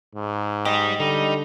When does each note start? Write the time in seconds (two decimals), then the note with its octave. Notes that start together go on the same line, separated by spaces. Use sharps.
0.15 G#2
0.65 G3 G4 D#5
1.00 D3 G3 D#4